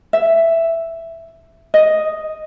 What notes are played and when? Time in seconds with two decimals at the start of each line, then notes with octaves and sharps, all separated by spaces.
0.13 E5
1.74 D#5